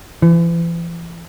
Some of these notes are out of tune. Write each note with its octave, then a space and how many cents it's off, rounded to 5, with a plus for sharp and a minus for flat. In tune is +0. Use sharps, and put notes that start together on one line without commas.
E3 +40